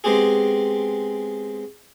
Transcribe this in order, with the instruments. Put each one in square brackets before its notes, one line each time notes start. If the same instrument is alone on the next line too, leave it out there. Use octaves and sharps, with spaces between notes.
[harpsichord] G#3 B3 C4 G4 G#4